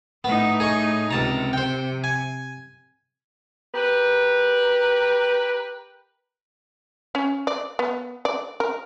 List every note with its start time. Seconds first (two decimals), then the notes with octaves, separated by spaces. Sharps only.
0.24 A2 B3 D#4
0.60 G#4 D#5 C#6
1.11 C#2 C3 A5 A#5
1.53 C5 G5
2.04 G#5
3.75 G4 A#4 B4
7.15 C#4
7.47 D5
7.79 B3
8.25 D5
8.60 A#4